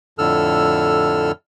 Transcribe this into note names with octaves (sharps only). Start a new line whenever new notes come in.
F2 A2 D3 A4 E6 F6